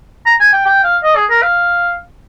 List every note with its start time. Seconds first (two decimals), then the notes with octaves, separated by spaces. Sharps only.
0.26 A#5
0.40 G#5
0.53 G5
0.65 G5
0.84 F5
1.04 D#5
1.16 G#4
1.30 A#4
1.42 F5